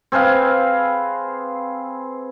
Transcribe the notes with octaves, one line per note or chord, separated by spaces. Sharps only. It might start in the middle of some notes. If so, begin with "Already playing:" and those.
C4 G#4 B4 F5